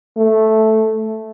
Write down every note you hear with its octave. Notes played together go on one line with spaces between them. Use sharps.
A3